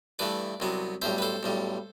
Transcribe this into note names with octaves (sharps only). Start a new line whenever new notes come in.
G2 E3 A3 B4 D5
C2 C3 F#3 B3
B1 A2 G3 C5 E5
B4
A4 C5
B1 A2 G3